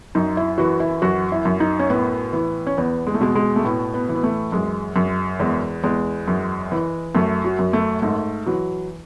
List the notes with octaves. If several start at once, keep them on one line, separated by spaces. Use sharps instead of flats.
F#2 D#4
E4
E3 F#4
E4
F#2 F#4
E4
F#2
D#4
C#4
A2 B3
E3
C#4
E2 B3
G#3
A3
B2 G#3
G#3
A3
A2 B3
B3
E3
B3
A3
F#2 G#3
F#2
E2 G#3
E2 G#3
F#2
E3
F#2 A3
F#3
F#2
A3
G#2 A3
E3 F#3